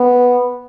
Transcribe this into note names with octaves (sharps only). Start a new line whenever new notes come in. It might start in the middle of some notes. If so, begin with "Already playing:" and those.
Already playing: B3